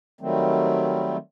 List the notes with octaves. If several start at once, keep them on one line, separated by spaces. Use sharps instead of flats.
D#3 F#3 G3 A3 C4